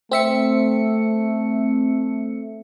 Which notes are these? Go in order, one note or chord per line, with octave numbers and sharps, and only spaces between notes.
A3 C4 E5 C#7